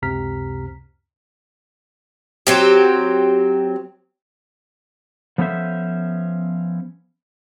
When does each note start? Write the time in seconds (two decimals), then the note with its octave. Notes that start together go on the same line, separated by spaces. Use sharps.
0.02 C#2 F#2 C3 A#5 F6 B6
2.47 F#3 C4 G4
5.38 F3 B3 C#4 A4 C5 E5